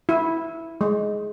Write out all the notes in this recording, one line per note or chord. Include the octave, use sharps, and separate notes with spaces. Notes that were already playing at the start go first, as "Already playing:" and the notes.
E4
G#3